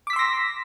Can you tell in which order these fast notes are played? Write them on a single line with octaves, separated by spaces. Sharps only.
D6 B6 E6 C6 A#6